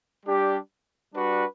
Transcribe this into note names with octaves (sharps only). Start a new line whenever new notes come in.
G3 D4 G4
G3 D4 F#4 B4